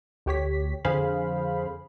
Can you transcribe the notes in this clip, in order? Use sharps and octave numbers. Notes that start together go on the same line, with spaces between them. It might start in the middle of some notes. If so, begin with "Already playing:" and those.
D2 G4 C#5 B6
F2 D3 G#4 C5 F5 B5